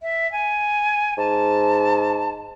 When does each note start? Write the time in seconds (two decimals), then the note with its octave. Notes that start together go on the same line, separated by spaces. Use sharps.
0.02 E5
0.32 G#5
1.18 G#2 A5